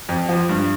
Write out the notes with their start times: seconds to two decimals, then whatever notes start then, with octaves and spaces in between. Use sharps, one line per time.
0.09 F2
0.29 F3
0.49 G2